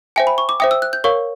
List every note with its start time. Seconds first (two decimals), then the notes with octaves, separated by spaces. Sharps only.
0.16 C5 E5 G5 G#5
0.27 B5
0.38 C#6
0.49 D6
0.60 C5 E5 G5 D#6
0.71 E6
0.82 F#6
0.93 G6
1.04 A#4 C#5 F5 C#6